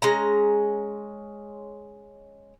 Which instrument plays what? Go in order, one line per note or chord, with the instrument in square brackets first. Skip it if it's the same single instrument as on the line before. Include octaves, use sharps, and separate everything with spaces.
[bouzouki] G#3 C#4 A#5